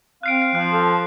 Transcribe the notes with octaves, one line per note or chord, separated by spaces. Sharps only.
C4 F5 F#6 C7 D7
C7 D7
F3 F#6
A4